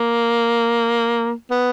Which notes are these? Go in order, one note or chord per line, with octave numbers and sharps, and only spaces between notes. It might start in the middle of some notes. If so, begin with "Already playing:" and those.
Already playing: A#3
B3